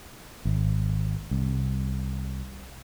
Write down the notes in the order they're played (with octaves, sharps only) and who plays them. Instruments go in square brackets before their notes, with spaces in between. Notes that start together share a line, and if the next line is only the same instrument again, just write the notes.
[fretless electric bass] G#1
C2